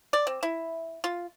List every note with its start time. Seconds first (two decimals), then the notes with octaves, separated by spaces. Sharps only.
0.13 D5
0.27 C4
0.43 E4
1.04 F4